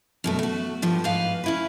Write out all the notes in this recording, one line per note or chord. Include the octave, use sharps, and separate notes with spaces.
F#2 B2 A3
A3 F#4
G2 F3 G3
G#2 B4 F5
C#4 E4 B4